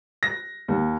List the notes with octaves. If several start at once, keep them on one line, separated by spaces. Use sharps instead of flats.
A#6
D#2